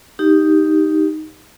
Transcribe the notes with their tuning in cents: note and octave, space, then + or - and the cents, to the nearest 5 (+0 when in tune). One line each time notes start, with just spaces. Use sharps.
D#4 +0 G4 +0